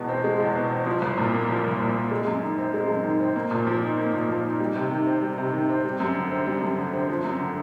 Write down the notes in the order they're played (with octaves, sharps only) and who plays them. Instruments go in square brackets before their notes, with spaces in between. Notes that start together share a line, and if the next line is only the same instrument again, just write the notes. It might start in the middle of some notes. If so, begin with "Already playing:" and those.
Already playing: [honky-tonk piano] E2 B2 G#3
C4
G#3
E2
B2
C4
F3
C2
A#2
A#3
F3
C2
A#2
A#3
G#3
F#2
D#3
C4
G#3
F#2
D#3
C4
A#3
A#2
F3
D#4
A#3
A#2
F3
D#4
G3
C3
D#3
C4
G3
C3
D#3
C4
G3
F#2
D3
C4
G3
F#2
D3
C4
F3
F#2
D3